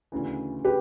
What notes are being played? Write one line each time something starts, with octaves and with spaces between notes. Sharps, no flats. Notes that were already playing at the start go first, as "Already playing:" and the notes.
D2 C#3 E3
G4 B4